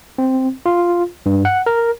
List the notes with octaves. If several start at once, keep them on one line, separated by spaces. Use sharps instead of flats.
C4
F4
G2
F#5
A#4